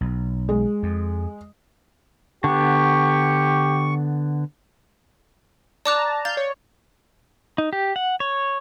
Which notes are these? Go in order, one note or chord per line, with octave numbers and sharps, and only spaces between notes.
B1
G#3
F2
D3 B3 G4 C#6
D5 A5 A#5 D6 F#6
F5 G6 A6
C#5
D#4
G4
F#5
C#5